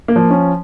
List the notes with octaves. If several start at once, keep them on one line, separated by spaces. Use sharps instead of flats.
A#3
F3
C#4